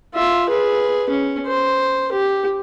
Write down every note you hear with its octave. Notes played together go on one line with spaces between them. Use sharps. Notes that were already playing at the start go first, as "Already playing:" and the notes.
F4 E5
G#4 B4
C#4
C5
G4